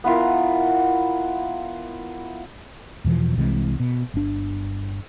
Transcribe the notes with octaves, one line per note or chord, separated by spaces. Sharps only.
B3 E4 F4 A#4
E2 B2 E3 F3
C2 C3 E3 G#3
B2
G1 D4